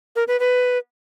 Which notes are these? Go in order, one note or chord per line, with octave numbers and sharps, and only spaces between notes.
A#4
B4
B4